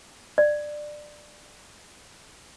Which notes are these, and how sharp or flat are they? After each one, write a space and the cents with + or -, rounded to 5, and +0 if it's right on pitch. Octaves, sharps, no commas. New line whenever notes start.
D5 +20